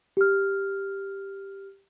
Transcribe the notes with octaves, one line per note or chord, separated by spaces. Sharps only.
G4 F6